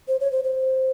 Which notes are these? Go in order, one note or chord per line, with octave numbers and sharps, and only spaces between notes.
C5
C#5
C5
C5